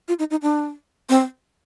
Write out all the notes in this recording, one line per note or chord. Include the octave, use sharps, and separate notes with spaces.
F4
D#4
D#4
D4
C4